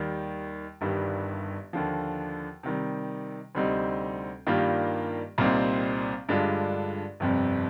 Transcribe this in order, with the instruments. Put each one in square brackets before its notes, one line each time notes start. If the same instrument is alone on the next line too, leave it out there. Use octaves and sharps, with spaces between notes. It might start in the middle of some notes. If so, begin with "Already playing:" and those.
Already playing: [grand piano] D#2 D#3 G3
G1 G2 D#3 G3
D#2 D3 F3
C3 D#3 G3
D2 C3 G3 C4 D#4
G2 D#3 G3 A#3 F4
C2 A#2 G3 C4 D#4
G2 D3 G#3 D4 F4
G1 F2 C3 G3